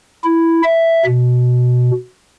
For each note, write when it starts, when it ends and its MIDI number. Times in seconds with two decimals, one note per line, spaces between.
0.24 0.61 64
0.63 1.04 76
1.06 1.91 47